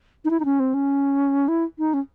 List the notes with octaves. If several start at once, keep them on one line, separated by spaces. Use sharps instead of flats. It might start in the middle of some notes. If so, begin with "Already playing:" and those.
D#4
E4
D#4
C#4
C4
C#4
E4
D#4
C#4